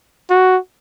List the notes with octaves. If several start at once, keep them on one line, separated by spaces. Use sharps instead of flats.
F#4